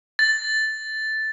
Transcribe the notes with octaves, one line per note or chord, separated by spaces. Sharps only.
A6